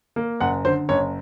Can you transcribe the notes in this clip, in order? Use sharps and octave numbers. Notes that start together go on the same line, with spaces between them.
A#3
F#1 F#5
D3 C5
F#1 C#5